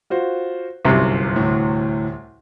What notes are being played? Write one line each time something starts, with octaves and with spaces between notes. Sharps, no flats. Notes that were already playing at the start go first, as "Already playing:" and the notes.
F4 F#4 C5
G1 C2 F#2 C3
D2 A2